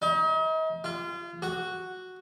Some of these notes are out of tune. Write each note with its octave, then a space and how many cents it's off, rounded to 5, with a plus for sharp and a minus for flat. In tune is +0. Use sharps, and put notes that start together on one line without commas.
D#4 +40
F4 -30
F#4 +0